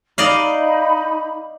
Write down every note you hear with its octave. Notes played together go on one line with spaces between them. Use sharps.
D#4 D5 D#5 F5 B5